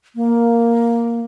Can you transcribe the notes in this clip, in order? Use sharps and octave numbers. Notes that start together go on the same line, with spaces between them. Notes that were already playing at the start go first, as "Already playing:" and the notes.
A#3